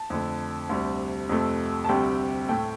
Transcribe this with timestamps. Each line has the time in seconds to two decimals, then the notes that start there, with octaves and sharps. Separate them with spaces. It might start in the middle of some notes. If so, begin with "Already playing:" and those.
Already playing: A5
0.10 F2 D3 A3
0.69 D2 C3 G3
1.29 F2 C3 A3
1.84 A5
1.89 D2 C3 G3 G5
2.49 A2 A3 G5